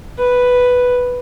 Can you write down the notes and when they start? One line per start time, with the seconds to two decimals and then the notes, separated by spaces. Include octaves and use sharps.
0.19 B4